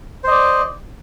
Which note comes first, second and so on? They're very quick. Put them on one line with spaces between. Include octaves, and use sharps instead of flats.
C5 D#5 D5